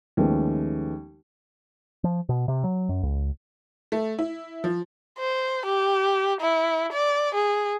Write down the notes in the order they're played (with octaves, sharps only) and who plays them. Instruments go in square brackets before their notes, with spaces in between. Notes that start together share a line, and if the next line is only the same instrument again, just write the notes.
[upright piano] D#2 F3 G#3 A3 B3 C#4
[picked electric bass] F3
B2
C3
F#3
F#2
C#2
[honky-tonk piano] A3
E4
F3
[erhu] C5
G4
E4
D5
G#4